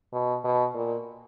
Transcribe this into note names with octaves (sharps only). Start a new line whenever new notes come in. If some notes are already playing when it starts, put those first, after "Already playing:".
B2
B2
A#2